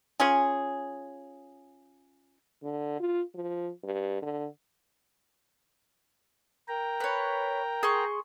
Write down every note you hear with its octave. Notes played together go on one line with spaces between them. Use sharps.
C#4 F4 G#4
D3
F4
F3
G2
D3
A#4 G5 A#5
B4 C#5
G#4 C6 C#6